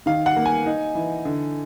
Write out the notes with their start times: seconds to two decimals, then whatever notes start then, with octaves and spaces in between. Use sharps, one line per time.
0.06 D#3 F5
0.26 F#5
0.36 A#3
0.46 G#5
0.66 D#4
0.95 E3
1.25 D3